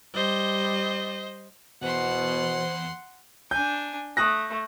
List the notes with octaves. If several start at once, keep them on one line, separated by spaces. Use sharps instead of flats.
G3 C5 D#5
E2 B2 E3 C5 F#5 C6
D4 G#5 G6
A3 D#6 F#6 A#6